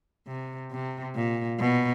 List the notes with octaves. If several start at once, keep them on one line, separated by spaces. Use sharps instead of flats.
C3
C3
A#2
B2